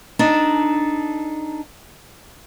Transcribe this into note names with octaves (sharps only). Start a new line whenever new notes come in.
D4 D#4 A4